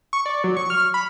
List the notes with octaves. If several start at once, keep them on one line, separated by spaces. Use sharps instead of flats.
C#6
D5
F#3
C#6
F6
B5